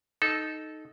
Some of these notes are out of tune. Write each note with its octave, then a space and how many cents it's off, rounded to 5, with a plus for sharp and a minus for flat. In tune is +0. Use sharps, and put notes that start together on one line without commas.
D#4 +0 A4 -15